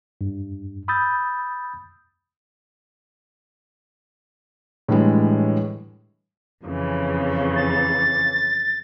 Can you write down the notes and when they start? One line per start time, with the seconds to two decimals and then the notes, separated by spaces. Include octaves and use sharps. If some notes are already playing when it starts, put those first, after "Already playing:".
0.21 G2
0.88 B5 D#6 E6 G6 A6
4.88 A2 D3 E3 G3 G#3
6.65 F2 C#3 E3
7.56 A6